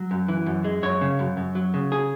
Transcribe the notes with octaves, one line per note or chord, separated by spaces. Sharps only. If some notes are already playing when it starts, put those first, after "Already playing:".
Already playing: F#3
F#2
E3
F#2
G#3
F#2 C#5
C#3
F#2
F#2
F#3
C#3
G#4